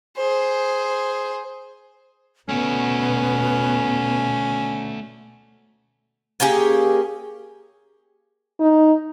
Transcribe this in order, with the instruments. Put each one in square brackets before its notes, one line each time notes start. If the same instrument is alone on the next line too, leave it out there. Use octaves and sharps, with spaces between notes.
[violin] G#4 C5
[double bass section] B2 [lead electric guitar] A3 F#4 [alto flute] B3 [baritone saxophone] C#4
[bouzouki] A#3 C#4 G4 G#4
[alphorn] D#4